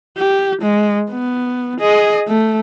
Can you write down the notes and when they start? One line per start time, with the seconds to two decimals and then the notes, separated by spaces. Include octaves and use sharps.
0.18 G4
0.61 G#3
1.10 B3
1.80 G#4 D#5
2.28 A3